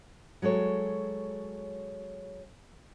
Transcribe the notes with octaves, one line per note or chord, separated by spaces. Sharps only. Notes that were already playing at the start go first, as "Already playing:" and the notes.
F#3 G#3 A4 C#5